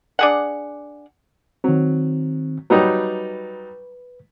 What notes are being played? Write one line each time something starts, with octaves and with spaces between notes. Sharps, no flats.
D4 G#4 F#5
D#3 F#3 C4
F#3 G3 D#4 B4